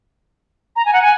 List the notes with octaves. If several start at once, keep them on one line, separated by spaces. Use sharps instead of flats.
A#5
G#5
F#5
G#5